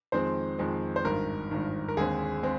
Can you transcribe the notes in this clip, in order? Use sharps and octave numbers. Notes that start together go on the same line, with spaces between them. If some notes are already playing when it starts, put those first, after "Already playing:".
F2 D#3 G#3 C4 C5
F2 D#3 G#3 C4
C5
G#1 G2 D#3 A#4
G#1 G2 D#3
A#4
D#2 D3 G#3 C4 G#4
G#3 C4